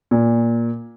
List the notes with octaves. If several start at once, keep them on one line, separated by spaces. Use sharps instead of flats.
A#2